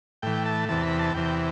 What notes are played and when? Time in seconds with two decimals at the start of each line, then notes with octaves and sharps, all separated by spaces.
0.22 A2 E3 G5
0.46 A5
0.69 E2 C3 E3 A5
0.83 B5
0.99 A5
1.15 E2 C3 E3 G5